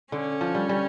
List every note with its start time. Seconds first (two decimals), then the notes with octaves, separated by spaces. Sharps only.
0.12 D3 C#4
0.41 F3
0.55 G3
0.69 G3